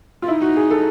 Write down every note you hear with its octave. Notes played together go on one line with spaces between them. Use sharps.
F4
D#4 E4
F#4
G#4
A4